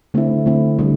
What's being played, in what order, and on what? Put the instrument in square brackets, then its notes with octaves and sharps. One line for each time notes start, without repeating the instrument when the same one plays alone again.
[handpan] D3 A3 C4 E4
D3 A3 C4 E4
D3 G3